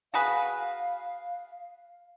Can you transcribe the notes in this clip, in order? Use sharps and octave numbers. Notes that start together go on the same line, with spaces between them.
F#4 G#4 B4 F5